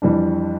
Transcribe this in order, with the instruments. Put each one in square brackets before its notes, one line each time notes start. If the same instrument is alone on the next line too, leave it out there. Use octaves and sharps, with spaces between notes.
[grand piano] F2 E3 G3 D4